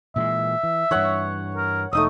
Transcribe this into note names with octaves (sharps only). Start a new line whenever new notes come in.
A#2 E3 G#3 E5
E3
G2 E3 C#5 F#5 C#6
A#4
E1 A3 D#4 E5 D#6